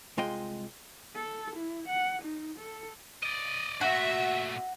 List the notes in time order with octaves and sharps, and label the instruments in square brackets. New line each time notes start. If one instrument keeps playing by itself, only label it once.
[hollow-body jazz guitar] C2 G#3 F4 D#5 G5
[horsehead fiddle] A4
E4
F#5
D#4
A4
[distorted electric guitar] D5 D#5
[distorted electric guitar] A#2 A3 [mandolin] F#4 [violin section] E5